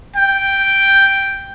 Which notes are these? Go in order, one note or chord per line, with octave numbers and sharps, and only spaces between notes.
G5